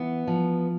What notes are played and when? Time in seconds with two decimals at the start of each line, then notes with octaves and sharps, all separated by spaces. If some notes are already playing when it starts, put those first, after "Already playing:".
Already playing: E3 B3
0.27 F3